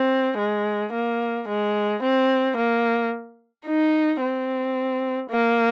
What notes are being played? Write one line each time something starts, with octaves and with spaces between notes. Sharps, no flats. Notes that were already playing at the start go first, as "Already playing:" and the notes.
Already playing: C4
G#3
A#3
G#3
C4
A#3
D#4
C4
A#3